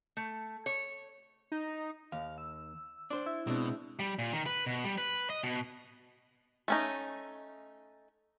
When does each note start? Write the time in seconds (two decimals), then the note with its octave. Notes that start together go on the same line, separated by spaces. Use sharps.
0.17 A3
0.66 C#5
1.52 D#4
2.12 D#2 F5
2.38 E6
3.10 D4 C5 D5
3.26 E4
3.47 B2 G#3 C4 D4
3.99 G3
4.19 A#2
4.33 D#3
4.46 B4
4.66 B2
4.84 G3
4.98 B4
5.30 D#5
5.43 B2
6.68 A3 C#4 D#4